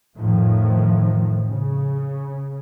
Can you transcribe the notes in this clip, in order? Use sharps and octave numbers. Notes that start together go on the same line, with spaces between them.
F2 A2 D#3 F3
C#3